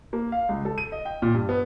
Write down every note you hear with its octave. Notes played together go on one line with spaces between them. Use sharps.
A#3
F5
C#2
A4
D#7
D#5
G5
A#2
G2
B3